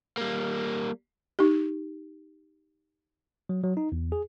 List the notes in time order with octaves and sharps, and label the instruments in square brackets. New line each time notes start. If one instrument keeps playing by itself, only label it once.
[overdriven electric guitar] G3 A#3
[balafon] D#4 G4
[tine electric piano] F#3
F#3
D#4
E2
G#4